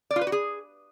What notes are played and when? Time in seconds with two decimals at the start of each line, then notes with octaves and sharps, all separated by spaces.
0.11 D5
0.16 F4
0.21 B4
0.27 F#4
0.32 G#4